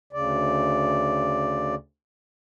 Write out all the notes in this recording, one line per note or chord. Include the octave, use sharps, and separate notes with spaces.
D2 C#3 D5